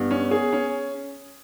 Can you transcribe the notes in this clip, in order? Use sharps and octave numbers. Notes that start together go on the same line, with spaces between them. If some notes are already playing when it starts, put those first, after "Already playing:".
Already playing: G2 B3
C#4
G#4
C#4